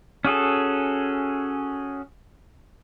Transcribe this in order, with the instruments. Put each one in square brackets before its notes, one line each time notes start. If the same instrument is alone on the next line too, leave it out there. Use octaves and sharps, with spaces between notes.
[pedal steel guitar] C#4 F#4 G#4 A4